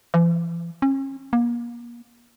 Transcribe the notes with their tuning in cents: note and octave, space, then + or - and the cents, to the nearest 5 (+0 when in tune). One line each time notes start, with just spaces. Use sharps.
E3 +45
C#4 -35
A#3 +35